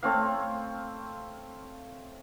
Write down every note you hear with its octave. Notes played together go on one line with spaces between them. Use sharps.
A3 C4 C#5 F5